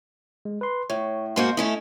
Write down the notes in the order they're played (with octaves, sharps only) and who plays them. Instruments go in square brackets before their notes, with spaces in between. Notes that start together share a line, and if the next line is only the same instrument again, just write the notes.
[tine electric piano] G#3
B4 C6
[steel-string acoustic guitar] A2 [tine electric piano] C#5
[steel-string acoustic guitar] G#2 A#3 F#4 [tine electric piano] C6 G6
[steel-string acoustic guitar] A3 C#4 E4 [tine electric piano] D#5